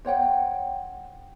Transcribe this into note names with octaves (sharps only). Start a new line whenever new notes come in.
C5 C#5 F#5 G5